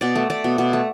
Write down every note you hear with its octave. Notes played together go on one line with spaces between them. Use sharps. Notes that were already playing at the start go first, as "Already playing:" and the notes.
B2 D5
A3
A3 D5
B2
B2
A3